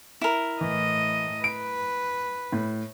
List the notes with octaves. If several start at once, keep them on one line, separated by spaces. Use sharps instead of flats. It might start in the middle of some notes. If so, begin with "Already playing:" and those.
E4 A#4
A2 E3 D#5
B4 D7
A2